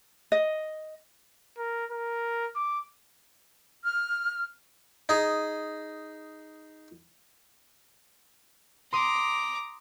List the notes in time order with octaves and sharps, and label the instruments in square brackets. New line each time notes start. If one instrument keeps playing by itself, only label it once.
[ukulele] D#5
[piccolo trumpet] A#4
A#4
D6
[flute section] F6
[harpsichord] D#4 G#4
[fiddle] A#5 D6 [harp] C6 D#6